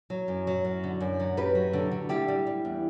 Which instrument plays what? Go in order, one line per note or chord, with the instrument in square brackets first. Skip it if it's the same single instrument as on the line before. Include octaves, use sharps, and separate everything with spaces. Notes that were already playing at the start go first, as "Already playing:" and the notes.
[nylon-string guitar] F#3
F#2
F#3
F#2
D3
F#2
F#3
F#2 G4 B4
F#3
D3
D3
G3 E4 G4
G3
G3
E2